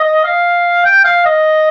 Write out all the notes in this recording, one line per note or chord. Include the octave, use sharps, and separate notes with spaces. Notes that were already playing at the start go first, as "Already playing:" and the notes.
Already playing: D#5
F5
G5
F5
D#5